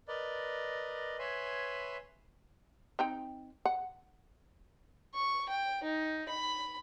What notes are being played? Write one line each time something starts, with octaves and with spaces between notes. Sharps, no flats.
A#4 B4 D5 D#5
B4 C#5 E5 G#5 B5 C6
C4 D#4 G5
F#5
C#6
G5
D#4
B5